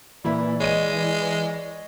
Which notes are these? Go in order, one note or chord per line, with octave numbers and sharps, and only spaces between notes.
A#2 E3 E4 D5 B5
G#3 C#5 D#5 D#7